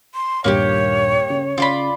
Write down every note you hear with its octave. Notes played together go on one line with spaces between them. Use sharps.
C6
D#1 G2 G3 A#3 E4 G4 C#5
C#3
C#3 F4 D5 B5